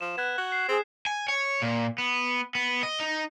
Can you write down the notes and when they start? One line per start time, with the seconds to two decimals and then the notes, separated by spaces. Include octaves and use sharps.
0.01 F3 E7
0.17 B3 F#6 G#6 E7
0.38 F#4
0.52 C7
0.68 C4 G#4
1.06 G#5
1.28 C#5
1.62 A#2
1.98 B3
2.55 B3
2.83 D#5
3.00 D#4